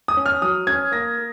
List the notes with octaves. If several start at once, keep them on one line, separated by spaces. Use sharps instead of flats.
D#6
C#4
F6
F#3 D#6
C#4 G#6
A#3 A#6
A#3